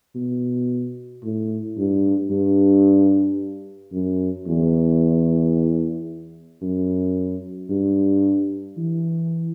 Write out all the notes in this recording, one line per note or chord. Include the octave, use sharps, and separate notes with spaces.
B2
A2
G2
G2
F#2
E2
F#2
G2
E3